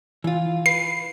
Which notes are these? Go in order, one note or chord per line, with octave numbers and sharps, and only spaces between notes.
E3 F4
B4 C7